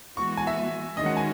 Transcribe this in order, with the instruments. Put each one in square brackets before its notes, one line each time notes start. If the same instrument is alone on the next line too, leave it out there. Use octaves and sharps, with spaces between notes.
[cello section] E3 G#3 B3 F#4 [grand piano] C#6
[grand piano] G#5
E5
[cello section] D#3 G#3 C#4 F#4 [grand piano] D#5
[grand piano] F#5
G#5